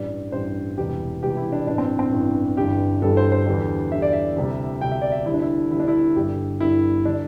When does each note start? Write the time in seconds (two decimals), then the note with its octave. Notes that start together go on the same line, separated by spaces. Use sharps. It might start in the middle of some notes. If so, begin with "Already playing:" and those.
Already playing: A1 G2 G3 D5
0.32 A1 G2 G3 C5
0.77 E1 E2 C3 E3 G3 G4
1.23 E1 E2 C3 E3 G3 G4
1.37 E4
1.52 D4
1.67 A1 G2 E3 D4
1.78 C4
1.99 C4
2.12 A1 G2 E3
2.57 G1 G2 E3 G3 G4
3.02 G1 G2 E3 G3 A4
3.17 C5
3.32 C5
3.47 E2 D3 G3
3.92 E2 D3 G3 E5
4.02 D5
4.13 E5
4.36 D2 C3 G3
4.81 D2 C3 G3 G5
4.92 E5
5.02 D5
5.12 E5
5.26 D2 D3 G3 E4
5.34 D4
5.42 E4
5.71 D2 D3 G3 E4
5.80 D4
5.88 E4
6.16 G1 G2 D3 G3 G4
6.60 G1 G2 D3 G3 E4
7.05 D3 G3 D4